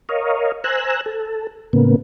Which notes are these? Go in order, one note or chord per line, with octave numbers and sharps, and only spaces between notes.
A#4 C#5 D#5 F5
C5 G#5 A#5 E6 F#6
A4
A2 C#3 A#3 B3